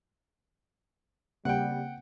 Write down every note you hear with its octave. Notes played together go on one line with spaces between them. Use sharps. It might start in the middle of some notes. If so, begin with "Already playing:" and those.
C#3 G3 A#3 C4 F#5 G5